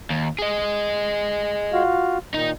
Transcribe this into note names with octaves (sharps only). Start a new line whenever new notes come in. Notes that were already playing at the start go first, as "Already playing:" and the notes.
D#2
G#4 D#5
F4 F#4 F5
A#2 D#3 D#4